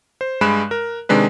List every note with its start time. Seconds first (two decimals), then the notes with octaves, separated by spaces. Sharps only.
0.21 C5
0.41 G2 G#3 B5 F#6 E7
0.71 A#4
1.09 C3 D#3 G#3 D4 B4